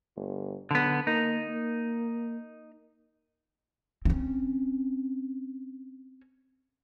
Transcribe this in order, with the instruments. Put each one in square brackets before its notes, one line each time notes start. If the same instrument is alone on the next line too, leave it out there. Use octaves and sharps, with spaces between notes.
[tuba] G1
[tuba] B1 [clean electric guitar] D3 B3
[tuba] A#3 [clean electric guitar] D#4
[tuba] A#3
[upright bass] C4 C#4